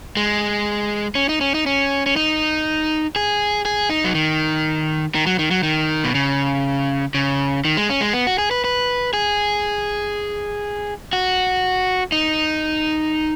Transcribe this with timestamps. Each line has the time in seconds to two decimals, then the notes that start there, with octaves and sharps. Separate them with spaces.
0.17 G#3
1.15 C#4
1.29 D#4
1.41 C#4
1.54 D#4
1.66 C#4
2.06 C#4
2.16 D#4
3.16 G#4
3.65 G#4
3.90 D#4
4.04 F#3
4.15 D#3
5.15 D#3
5.26 F#3
5.39 D#3
5.51 F#3
5.63 D#3
6.04 B2
6.15 C#3
7.14 C#3
7.65 D#3
7.77 G#3
7.90 C#4
8.01 G#3
8.13 B3
8.27 F#4
8.38 G#4
8.51 B4
8.64 B4
9.13 G#4
11.13 F#4
12.12 D#4